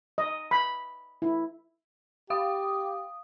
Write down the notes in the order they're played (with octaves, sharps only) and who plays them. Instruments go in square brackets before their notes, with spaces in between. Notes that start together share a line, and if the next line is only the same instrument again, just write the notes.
[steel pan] D#5
B5
E4
[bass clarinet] G4 [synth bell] F5 D#6